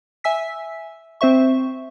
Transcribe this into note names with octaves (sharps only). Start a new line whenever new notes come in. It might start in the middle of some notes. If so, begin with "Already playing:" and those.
E5 G#5 E6 B6
C4 C5 E5 C#6